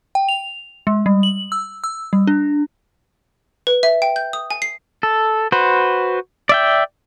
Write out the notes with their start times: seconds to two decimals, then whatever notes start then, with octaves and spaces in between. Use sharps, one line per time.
0.15 G5
0.29 F7
0.87 G#3
1.06 G3
1.23 F#7
1.52 E6
1.84 E6
2.13 G3
2.27 D4
3.67 B4
3.83 E5
4.02 G5
4.16 G6
4.33 D#6
4.50 G#5
4.62 C7
5.03 A4
5.52 F#4 B4 C5
6.49 D5 E5 G5